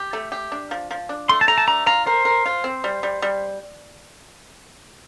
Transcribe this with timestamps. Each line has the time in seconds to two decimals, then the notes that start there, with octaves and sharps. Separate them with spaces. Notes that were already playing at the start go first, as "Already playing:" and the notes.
Already playing: G4
0.13 A3
0.32 G4
0.52 D4
0.71 F3
0.91 F3
1.09 D4
1.29 A3 C6
1.41 A5
1.48 A3 A#5
1.58 A5
1.67 D4 A#5
1.86 F4 A#5
2.06 A#4 C5
2.25 A#4
2.46 F4
2.64 C4
2.84 G3
3.03 G3
3.22 G3